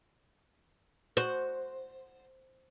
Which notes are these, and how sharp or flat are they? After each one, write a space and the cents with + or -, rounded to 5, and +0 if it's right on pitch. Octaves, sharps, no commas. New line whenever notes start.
F#4 +0 C5 +0